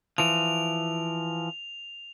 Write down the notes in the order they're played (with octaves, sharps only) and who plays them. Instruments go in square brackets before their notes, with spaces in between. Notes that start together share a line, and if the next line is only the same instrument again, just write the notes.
[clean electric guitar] E3 F3 [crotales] F7